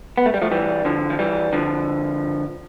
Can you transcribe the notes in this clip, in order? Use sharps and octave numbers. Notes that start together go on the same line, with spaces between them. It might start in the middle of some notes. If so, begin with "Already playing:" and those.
B3
A3
G3
F3 A3
E3 G3
D3 F3
F3
E3 G3
D3 F3